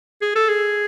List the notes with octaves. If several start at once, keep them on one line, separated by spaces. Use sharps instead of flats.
G#4
A4
G#4